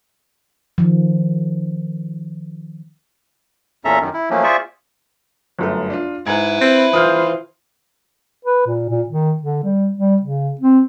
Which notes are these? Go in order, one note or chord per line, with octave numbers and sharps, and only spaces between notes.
D#3 F3
E2 A#2 C#4 A4 E5 A#5
F#2 D#3
E4
F3 F#3 A3 A#3 C#4
F4 G#4 C5 D5 E5 C#6
G1 F#2 A3
D4 F4
G#2 E4 B4 G#6
C4
E3 F4 C5 D#6 F6 G6
B4
A#2
A#2
D#3
D3
G3
G3
C#3
C4